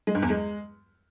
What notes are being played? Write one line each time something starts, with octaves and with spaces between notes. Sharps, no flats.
G#3
G2
E2
G#3